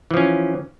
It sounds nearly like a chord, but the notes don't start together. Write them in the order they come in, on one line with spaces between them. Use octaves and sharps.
E3 F3 C#4